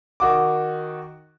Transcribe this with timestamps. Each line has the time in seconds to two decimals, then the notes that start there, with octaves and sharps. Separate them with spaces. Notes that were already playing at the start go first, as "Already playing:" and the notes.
0.20 D#3 F#4 D6